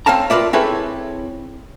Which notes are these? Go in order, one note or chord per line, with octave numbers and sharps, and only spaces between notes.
C4 C#5 F5 A5 A#5
F4 A#4 B4 D5 E5
C4 E4 G#4 A4 B4 C#5